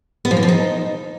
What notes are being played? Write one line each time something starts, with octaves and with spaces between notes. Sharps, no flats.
B3
F3
E3
F3
D#4